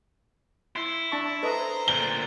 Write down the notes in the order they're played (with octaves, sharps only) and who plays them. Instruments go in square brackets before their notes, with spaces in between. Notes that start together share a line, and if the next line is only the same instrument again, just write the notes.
[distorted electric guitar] E4 [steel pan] C6
[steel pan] D4 A5 C#6
[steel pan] A4 B4 D#5 [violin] C5 A#5
[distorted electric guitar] D2 A#2 [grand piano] G7